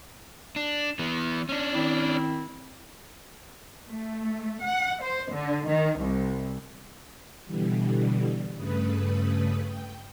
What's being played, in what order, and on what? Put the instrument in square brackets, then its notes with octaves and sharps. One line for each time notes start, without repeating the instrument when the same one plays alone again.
[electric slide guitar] D4
E3 B3
C#4 D4
[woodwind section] D#3 C4 E4
[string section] A3
F#5
C5
D3
D#3
C2
[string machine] B2 D3 E3 G3
G2 C#3 A3 B4 D#6
G5